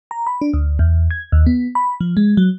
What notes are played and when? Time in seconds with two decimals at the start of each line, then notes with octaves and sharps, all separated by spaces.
0.11 A#5
0.27 B5
0.42 D4
0.54 D2
0.79 E2
1.11 G#6
1.32 D#2
1.46 B3
1.75 B5
2.01 F3
2.17 G#3
2.37 F#3